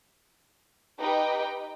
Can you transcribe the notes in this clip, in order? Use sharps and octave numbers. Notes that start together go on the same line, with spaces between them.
D#4 G4 B4 D#5 G5